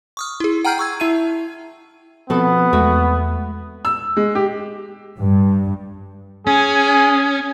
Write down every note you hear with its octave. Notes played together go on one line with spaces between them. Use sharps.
C#6 D#6 F6
E4 G#4
F#5 G5 A#5 F6 G6 C7
G5 C#6 E6 G#6
E4 E5 A5 D#7
B2 F3 B3 C4 A4
E2 G#3 A3 F#4
E6
G#3
G4
G2
C#4 G#4